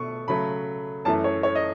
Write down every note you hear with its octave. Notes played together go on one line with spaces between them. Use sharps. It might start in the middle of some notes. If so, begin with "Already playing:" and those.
Already playing: B2 A3 C#6
C#3 F#3 A3 B5
F#2 E3 A3 A5
C#5
C#5
D#5